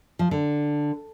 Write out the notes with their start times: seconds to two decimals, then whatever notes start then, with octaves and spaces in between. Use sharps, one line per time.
0.19 F3
0.31 D3